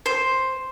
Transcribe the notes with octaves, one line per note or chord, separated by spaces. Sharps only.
C5